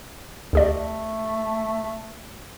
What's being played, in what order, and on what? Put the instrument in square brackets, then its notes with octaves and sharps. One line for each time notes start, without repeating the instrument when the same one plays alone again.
[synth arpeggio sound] D2 G4 D5 [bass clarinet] A3